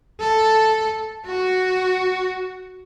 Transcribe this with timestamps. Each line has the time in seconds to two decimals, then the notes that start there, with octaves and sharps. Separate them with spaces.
0.20 A4
1.26 F#4